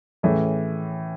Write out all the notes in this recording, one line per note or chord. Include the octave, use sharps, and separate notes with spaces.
A2 E3 A3 C#4 G#4